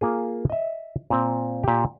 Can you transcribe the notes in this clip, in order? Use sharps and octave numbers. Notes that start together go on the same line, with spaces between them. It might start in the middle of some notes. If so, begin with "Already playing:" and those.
A#3 F4 G#4
D#5 E5
A#2 C4
A#2 G4